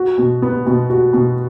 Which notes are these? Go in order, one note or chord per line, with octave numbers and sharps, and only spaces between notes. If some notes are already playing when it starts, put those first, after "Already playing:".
Already playing: F#4
B2
B3
B2
F#4
B2